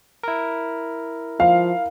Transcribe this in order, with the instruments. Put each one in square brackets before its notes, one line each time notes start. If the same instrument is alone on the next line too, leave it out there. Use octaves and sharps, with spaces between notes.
[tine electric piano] E4 A#4
[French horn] F3 [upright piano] F5